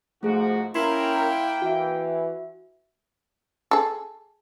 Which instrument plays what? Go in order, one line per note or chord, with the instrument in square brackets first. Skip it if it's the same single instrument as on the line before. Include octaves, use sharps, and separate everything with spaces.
[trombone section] G#2 [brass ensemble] F3 F#4 [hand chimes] A3 G#4
[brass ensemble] A#3 G5 [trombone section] C#4 A#4 [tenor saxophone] E4 [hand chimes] C6 G#6 C7
[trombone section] E3 [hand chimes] F#4 E5
[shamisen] G#4 A4